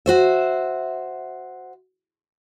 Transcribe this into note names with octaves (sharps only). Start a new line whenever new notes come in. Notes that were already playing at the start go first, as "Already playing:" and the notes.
F#4 C5 E5